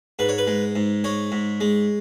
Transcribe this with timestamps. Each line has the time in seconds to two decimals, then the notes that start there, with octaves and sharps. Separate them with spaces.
0.19 G#2 B4
0.29 C#5
0.38 B4
0.47 G#3
0.76 G#2
1.04 G#3 C#5
1.32 G#2
1.61 G#3